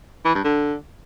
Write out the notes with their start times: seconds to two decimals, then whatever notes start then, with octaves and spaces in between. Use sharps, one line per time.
0.25 E3
0.35 G2
0.44 D3